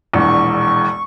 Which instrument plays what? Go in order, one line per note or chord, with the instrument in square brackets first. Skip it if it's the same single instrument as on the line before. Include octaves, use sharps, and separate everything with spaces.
[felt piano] E1 A#1 E2 [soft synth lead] C#6